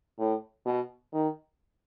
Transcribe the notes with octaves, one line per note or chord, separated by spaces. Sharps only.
A2
B2
D#3